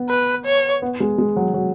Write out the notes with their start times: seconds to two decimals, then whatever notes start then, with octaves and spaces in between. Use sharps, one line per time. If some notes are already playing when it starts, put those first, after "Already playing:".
Already playing: B3
0.09 B4
0.45 C#5
0.82 B3
1.00 G#3
1.18 G#3
1.36 F#3
1.54 F#3